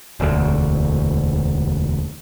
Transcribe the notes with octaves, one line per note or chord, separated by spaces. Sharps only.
E1 D2